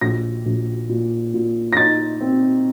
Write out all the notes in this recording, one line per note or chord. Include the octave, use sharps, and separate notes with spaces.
A#1 A#6
A#1
A#2
A#2
A#6
D#4 A6
C4